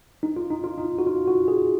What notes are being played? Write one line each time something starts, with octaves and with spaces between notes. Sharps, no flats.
D#4
F4
D#4
F4
D#4
F#4
F4
F#4
G#4